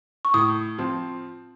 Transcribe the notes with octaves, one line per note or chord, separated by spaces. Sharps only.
C#6
A2 D#6
F3 C4 F4